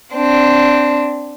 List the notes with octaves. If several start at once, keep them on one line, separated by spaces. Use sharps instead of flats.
C4 D4